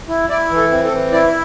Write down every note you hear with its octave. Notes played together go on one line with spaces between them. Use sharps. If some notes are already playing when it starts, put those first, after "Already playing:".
E4
E4 D5
E3
A4
C4
A4
E3
E4 D5